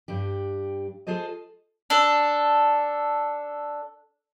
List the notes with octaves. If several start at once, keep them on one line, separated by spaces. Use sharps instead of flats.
G2 D4 G4
F4 G#4 A4 C5 D#5
D4 A4